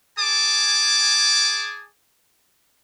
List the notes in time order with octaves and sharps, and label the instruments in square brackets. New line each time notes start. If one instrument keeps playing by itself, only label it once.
[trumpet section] G#4 G#5 A5 D6